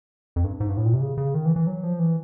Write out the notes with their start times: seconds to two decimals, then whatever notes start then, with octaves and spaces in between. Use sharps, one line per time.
0.36 F2
0.44 G2
0.60 G#2
0.69 G2
0.77 A2
0.85 A#2
0.94 C3
1.01 C#3
1.18 C#3
1.34 D#3
1.45 E3
1.56 E3
1.67 F#3
1.83 F3
1.99 E3